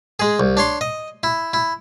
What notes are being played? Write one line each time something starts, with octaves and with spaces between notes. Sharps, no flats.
G#3 G#4
C2
D4 C#5 C6
D#5
E4
E4